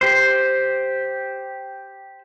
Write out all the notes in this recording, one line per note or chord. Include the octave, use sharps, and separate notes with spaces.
G4 C5